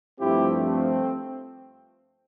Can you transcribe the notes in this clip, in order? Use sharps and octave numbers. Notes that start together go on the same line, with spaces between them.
G2 F3 A3 C4 E4 G4
C4